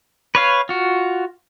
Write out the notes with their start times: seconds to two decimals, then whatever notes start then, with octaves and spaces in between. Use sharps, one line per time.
0.35 B4 C#5 F5
0.69 F4 F#4